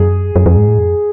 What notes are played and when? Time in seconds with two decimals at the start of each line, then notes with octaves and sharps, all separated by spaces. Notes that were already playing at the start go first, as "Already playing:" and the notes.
Already playing: F#2 G#4
0.36 F#2
0.46 F2
0.57 G#2
0.68 A2
0.78 F2